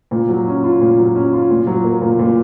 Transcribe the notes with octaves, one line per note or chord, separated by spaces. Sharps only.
A#2
F#3
C#4
F4
A#2
F#3
C#4
F4
A#2
F#3
A#3
A#2
A#2